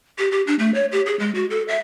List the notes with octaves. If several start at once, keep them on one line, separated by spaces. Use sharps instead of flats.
G4
G4
D4
A3
C#5
G4
G#4
G#3
F#4
A4
E5